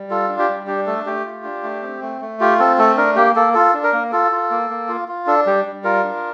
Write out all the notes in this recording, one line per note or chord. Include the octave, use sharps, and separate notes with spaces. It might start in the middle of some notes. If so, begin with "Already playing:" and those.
Already playing: G3
F4 A4
D4
G4
G3
D4 G4
A3 A4
A3 G4
F4
D4
A3
C4
A3
A3
F4 G4
C4 A4
A3 A4
D4 A#4
A#3 G4
A#3 A4
F4 A4
D4
A#4
A#3
F4 A4
F4
A#3
A#3
F4
F4
D4 A4
G3 G4
G3
F4 A#4
D4